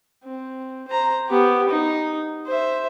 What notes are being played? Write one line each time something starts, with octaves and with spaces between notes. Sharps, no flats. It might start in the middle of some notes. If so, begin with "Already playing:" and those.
C4
C5 A#5
B3 G4
D#4
C5 E5